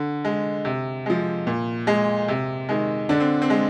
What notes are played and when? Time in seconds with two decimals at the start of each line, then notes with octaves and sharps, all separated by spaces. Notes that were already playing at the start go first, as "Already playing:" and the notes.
Already playing: D3
0.25 G#3
0.65 C3
1.06 F3 G#3
1.47 A#2
1.87 G#3
2.28 C3
2.69 D#3 G#3
3.09 D3 D4
3.20 C4
3.42 C4
3.50 G#3